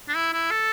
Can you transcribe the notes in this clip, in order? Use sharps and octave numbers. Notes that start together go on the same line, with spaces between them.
D4
E4
E4
A4